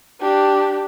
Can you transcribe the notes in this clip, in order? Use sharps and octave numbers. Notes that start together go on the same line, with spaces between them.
D4 G4